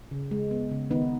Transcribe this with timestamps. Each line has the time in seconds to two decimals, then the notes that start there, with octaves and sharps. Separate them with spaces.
0.11 C#3
0.31 G#3
0.51 B3
0.71 C#3
0.90 D#3 B3 D#4